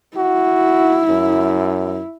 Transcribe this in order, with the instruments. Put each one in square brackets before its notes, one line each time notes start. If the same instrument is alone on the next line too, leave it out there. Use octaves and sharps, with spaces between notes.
[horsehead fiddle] E4 [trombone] F#4
[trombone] F#2